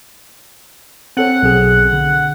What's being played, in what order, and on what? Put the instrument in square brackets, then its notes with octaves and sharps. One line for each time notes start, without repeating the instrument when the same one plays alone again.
[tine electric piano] C4 A4 C#5 [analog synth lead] F#5
[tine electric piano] B1 G#4
D3